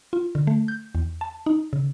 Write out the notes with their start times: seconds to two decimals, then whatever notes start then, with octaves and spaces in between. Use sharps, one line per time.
0.13 F4
0.35 D3
0.47 A3
0.68 G6
0.95 E2
1.21 A5
1.46 D#4
1.73 C#3